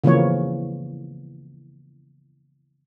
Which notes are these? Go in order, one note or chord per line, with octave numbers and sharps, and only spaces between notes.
C#3 E3 F3 A#3 C#5